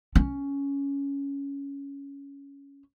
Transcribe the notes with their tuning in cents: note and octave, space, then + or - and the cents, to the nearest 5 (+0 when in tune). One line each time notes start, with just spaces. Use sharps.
C#4 +10